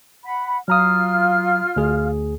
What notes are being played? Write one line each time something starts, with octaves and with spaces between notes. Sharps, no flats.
F#5 B5
F#3 F4 A#5 D#6 F6
D2 G#4